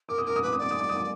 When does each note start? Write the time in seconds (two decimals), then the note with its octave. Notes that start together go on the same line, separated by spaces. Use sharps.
0.09 A#4 D6
0.18 D#6
0.25 A#4 D6
0.36 D#6
0.42 B4 D6
0.53 D#6
0.59 D5 D6
0.71 D#6
0.80 D6
0.89 D#6
0.97 D6